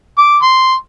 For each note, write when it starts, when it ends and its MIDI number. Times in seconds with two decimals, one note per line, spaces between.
0.18 0.37 86
0.42 0.74 84